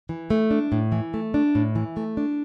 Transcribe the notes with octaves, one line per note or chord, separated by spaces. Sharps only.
E3
A3
D4
A2
E3
A3
D4
A2
E3
A3
D4